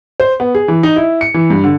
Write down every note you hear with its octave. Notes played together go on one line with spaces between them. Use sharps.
C5
B3
G#4
E3
D#4
E4
C#7
E3
G2
D3